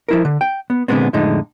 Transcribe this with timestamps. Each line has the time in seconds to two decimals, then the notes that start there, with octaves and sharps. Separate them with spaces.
0.09 F3 E4 A#4
0.25 D3
0.41 G5
0.70 B3
0.88 A#2 D3 F#3 G#3 B3 C4
1.13 F2 A2 D3 G#3 D#4